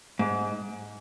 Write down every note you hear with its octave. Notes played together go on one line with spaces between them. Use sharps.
G#2